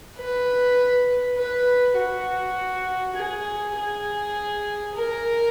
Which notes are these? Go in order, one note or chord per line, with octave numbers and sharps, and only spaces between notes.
B4
B4
F#4
G#4
G#4
A#4